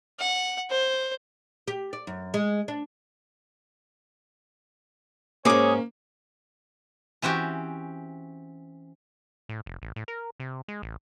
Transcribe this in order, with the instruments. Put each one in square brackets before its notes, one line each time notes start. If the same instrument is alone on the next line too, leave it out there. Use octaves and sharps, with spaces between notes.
[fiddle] F#5
C5
[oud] G4
D5
F#2
G#3
D4
[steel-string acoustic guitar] G#2 C#4 [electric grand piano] A#3 [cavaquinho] G#4 D6 D#6 [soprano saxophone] C#5
[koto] E3 C4 C#4 F#4 G4
[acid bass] A2
F1
A1
A2
A#4
C3
G#3
A1